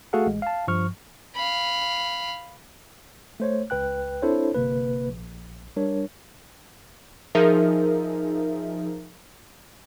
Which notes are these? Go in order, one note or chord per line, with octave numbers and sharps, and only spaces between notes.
A3 F#4 G#4 A4 F5 F#5
A1 G#3
F5 A5
G2 F3 C#6 F6
F5 B5
A3 C5 C#5
C#2 B4 G5 F#6
C4 D4 E4 A4 C5 C#5
G1 C3 A#3 B4
A#1
G3 D4 A#4 C#5
F3 D#4 G#4 A#4 E5